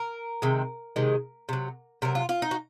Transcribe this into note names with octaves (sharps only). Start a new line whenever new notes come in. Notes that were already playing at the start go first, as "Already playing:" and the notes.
Already playing: A#4
C3 D#3 G#3
C3 D#3 G#3
C3 F#3
C3 F#3 A#4
F4
F4
D#4
F#4